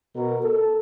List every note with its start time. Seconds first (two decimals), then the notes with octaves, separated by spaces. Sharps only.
0.14 B2 A#4
0.43 A4